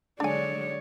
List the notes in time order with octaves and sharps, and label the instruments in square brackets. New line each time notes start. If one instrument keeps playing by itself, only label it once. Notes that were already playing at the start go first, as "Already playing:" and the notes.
[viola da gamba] D3 F#3 G#3 [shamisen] D4 G#5 [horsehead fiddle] C#5 D5